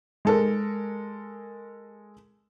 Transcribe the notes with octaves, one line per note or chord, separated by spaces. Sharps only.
G#3 A4 A#4